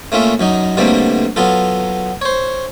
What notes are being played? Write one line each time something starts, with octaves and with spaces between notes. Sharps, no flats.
A3 A#3 C#4 F4 E5
F#2 F#3 D#4
B2 D3 G3 A3 A#3 C4
F#3 B3 F4 A4
C5 C#5